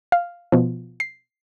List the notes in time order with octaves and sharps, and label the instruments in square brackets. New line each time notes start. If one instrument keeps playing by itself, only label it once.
[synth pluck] F5
B2 F3
C7